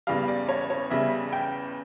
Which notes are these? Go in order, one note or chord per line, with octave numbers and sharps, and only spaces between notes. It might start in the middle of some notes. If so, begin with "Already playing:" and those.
E2 C#3 G3 F5
D5
C#5
C#5
E2 C#3 G3 E5
G5